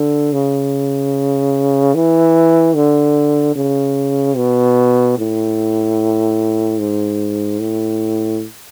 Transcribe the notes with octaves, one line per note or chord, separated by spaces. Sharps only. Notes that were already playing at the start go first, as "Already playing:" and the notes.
Already playing: D3
C#3
E3
D3
C#3
B2
A2
G#2
A2